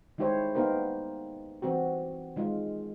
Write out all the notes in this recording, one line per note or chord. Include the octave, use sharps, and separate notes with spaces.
D#3 G#3 E4 G4 C5 C#5
A#3 B3 D#4 G4 A#4 C5
E3 C4 F#4 G4
D#3 G#3 F4